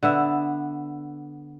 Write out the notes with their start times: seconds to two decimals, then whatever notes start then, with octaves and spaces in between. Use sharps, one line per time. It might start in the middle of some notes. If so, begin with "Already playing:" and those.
0.03 D3 B3 E5